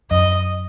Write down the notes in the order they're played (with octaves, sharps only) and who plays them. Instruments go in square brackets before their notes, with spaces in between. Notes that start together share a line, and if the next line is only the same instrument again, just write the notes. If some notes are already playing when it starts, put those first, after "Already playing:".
[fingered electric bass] F#2 [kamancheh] D#5